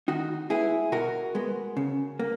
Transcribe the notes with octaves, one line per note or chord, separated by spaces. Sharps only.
D#3 D#4 F#4
G#3 B3 E4 G#4
B2 F#4 A#4
G#3 B3
C#3
A#3